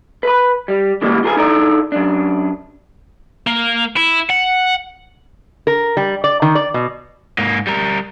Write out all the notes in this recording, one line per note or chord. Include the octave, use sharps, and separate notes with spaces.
B4 B5
G3
C#3 E3 G3 G#3 A#3 B3
F4 G#4 A#4 B4 G5 G#5
D#4 E4 A4 A#4 D5 A#5
F#2 D4
A#3
E4
F#5
A#4
G3
D5
D#3
D5
B2
G#2 A#3
G3 A#4